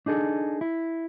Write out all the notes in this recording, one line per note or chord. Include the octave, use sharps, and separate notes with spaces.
D4 D#4 G#4 A4
E4